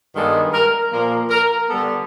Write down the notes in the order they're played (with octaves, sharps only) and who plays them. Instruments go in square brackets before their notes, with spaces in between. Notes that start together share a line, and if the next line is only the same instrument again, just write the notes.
[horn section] G2 D#3 G#3 B3 A4
A#4
A#2 F3 A#3 A#4
A#4
D3 G3 B3 A4